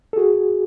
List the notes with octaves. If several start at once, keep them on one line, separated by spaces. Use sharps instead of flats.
A4
F#4 G#4